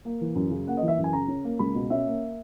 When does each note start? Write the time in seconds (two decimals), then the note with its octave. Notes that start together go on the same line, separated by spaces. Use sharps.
0.05 A#3
0.21 E3
0.35 F#2
0.51 C#3
0.67 A#3 F#5
0.77 D#5
0.82 E3
0.88 E5
0.98 F#2
1.04 G#5
1.13 C#3 A#5
1.28 C#4
1.44 A#3
1.59 C#2 B5
1.75 B2
1.90 C#4 E5
2.07 A#3